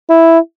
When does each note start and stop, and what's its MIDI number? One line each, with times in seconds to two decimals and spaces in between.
0.09 0.38 64